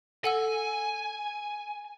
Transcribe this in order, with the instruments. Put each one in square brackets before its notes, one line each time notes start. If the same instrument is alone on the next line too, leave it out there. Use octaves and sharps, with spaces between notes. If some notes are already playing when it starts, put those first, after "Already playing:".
[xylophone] A4 F#5 E6 [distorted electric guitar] G#5